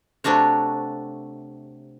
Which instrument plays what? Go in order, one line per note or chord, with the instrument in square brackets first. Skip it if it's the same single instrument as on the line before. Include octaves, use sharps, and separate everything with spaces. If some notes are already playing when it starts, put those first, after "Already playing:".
[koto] C3 A3 D4 F#4 C#5